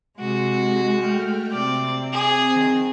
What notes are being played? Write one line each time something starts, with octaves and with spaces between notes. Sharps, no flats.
C3 G#3 F#4
A3 G5 F6
C3 C4 D5
G#4
D#3